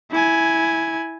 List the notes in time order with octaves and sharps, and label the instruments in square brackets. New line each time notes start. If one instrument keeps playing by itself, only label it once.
[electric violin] E4 G#5